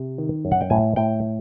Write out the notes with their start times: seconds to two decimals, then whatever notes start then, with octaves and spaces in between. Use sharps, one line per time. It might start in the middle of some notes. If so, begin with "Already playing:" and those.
Already playing: C3
0.18 D#3
0.45 F#2
0.52 F#5
0.61 G5
0.70 A2 G#5
0.96 A2 G5